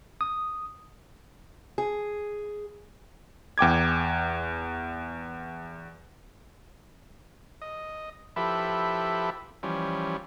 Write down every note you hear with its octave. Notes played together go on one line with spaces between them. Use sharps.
D#6
G#4
E2 G5 D6 G#6
D#5
F3 E4 G4 A4 B4 E5
E3 F3 G3 C#4